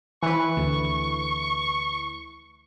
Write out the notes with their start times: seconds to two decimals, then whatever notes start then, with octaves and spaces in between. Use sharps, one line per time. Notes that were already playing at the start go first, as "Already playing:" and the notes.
0.22 E3 B4 C#6
0.57 D2 D3